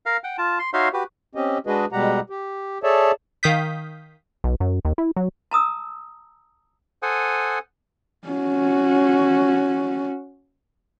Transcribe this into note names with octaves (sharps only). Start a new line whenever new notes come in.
A#4 F5
F#5 G5
F4 A5
C6
D#4 F#4 C#5 E5 F5 C6
F#4 G4 B4
C4 C#4 G4 D#5
G#3 D4 F#4 G#4 B4 D#5
B2 G3 G#3 G4 F#5 A#5
G4
G#4 A4 C#5 D5 E5 A5
D#3 F5 D#6 G6 B6
B1
F#2
D#2
E4
F#3
A5 A#5 D#6 E6
A4 C5 F#5 G#5 D#6
C#4 F#4